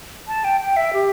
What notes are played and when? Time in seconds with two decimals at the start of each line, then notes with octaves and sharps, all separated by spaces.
0.28 A5
0.44 G5
0.61 G5
0.77 E5
0.93 G4